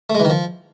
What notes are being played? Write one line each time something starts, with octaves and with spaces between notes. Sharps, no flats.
A3
G#3
E3
D#3
F3